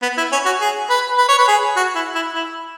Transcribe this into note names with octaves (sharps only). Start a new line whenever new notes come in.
B3
E4
C#4
F#4
G#4
B4
B4
C#5
B4
G#4
F#4
E4
E4
E4